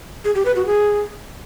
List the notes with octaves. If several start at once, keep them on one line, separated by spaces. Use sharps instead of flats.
G#4
G4
B4
F#4
G#4